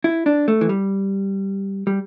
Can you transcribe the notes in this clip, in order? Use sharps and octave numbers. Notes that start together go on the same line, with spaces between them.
E4
D4
A3
E3
G3
G3